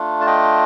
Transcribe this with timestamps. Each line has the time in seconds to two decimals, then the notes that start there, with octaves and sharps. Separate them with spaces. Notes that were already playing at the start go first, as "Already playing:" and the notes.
Already playing: A3 D4 F4
0.21 A5
0.26 D#5 G5